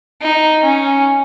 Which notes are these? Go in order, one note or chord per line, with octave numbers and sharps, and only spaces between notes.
D#4
C#4